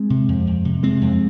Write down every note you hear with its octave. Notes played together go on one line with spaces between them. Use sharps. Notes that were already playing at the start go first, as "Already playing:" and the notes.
Already playing: G#3 C4
C3
F2
F2
C3
C3 G#3 C4
F2